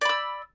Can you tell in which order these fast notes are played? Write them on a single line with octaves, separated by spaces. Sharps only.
D5 B5 E6